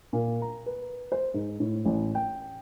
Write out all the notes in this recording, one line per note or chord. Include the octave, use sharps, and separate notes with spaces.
A#2
A#5
B4
C5
G#2
A2
A1
G5